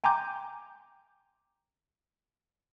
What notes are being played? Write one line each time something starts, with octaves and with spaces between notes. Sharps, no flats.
G5 G#5 A#5 C6 D6 G6